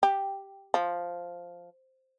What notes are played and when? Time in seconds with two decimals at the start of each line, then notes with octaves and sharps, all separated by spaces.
0.03 G4
0.74 F3